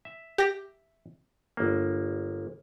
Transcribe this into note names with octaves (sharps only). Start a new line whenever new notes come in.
E5
G4 A#6
G1 A#3